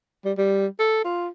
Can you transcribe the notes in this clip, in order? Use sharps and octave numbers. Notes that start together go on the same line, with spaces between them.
G3
G3
A4
F4